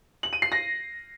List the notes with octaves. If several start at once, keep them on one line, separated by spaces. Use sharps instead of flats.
F#7
D#7
C7
A#6